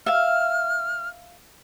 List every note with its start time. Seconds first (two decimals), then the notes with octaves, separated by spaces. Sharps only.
0.06 E5 F5 F6